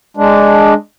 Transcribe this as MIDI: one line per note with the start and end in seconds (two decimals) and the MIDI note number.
0.17 0.74 56
0.17 0.74 62